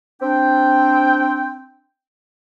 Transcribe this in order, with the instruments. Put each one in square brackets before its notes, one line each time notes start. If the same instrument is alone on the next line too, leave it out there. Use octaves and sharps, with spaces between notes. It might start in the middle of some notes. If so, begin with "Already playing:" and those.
[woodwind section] C4 D4 G5